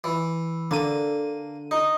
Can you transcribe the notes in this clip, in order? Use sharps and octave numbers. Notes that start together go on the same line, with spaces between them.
E3
D3 A#3 D#7
D#4